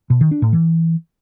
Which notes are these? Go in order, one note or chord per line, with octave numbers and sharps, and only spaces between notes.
B2
D#3
D4
A2
E3